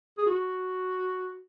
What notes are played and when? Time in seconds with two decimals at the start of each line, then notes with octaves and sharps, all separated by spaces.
0.18 G#4
0.26 F#4